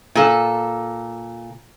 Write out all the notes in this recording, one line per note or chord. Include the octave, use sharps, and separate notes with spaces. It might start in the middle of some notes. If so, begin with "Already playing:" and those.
A#2 A4